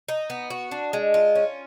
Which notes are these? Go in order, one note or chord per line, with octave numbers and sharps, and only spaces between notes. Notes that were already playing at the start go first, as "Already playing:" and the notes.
D#4
B3
F#4
D4
G#3
F4
C#4